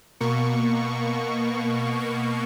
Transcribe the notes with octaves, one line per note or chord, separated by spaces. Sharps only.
B2 A#3 C#6
C#6